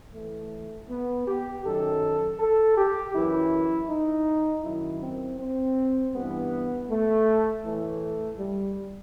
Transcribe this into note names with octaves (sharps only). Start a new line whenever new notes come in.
A2 E3 A3
B3
G4
F#2 D#3 A4
A4
G4
F#2 E3 E4
D#4
F#2 D#3 E4
C4
C4
G2 E3 B3
A3
A2 E3 A3
G3